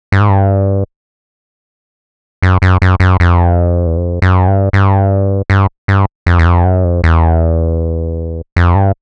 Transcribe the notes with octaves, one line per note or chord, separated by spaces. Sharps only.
G2
G#2
G2
F#2
F#2
F#2
F#2
F2
E2
F2
F#2
G2
G2
G2
G2
F2
E2
F2
F#2
F2
E2
F2
G2